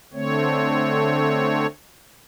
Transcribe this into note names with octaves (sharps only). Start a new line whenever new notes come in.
D3 A3 C4 C#5